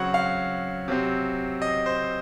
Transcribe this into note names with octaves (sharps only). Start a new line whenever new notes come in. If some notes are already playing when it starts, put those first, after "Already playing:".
Already playing: C#3 F#3 C4 C#5 F#5
F5
C3 F#3 C4
D#5
C5